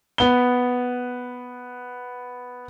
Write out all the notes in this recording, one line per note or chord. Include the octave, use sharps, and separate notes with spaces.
B3 G7